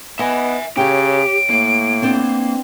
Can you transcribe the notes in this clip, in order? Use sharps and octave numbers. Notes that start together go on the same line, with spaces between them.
B3 D#5 E5 G#5
C#3 G4 C#5 G5 D7
A2 A#3
B3 C4 D4